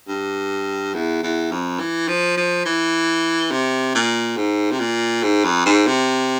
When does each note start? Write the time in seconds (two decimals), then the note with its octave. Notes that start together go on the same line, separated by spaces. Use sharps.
0.08 G2
0.94 E2
1.23 E2
1.52 F2
1.79 E3
2.08 F3
2.37 F3
2.65 E3
3.51 C3
3.95 A#2
4.37 G#2
4.71 C3
4.80 A#2
5.23 G#2
5.44 F2
5.66 G#2
5.87 C3